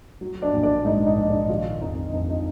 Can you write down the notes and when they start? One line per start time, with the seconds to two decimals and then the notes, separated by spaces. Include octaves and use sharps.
0.21 F#3
0.42 D4 D5
0.54 A#1
0.63 D4 D5
0.85 G#2 D#4 D#5
1.06 D#4 D#5
1.17 A#1
1.28 D4 D5
1.49 D#3 F3 F4
1.81 F2 D#4
2.13 F2 D#4
2.30 D#4